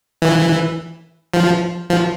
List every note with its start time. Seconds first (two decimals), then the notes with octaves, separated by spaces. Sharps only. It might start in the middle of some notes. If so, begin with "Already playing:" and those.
0.22 E3
1.34 F3
1.90 F3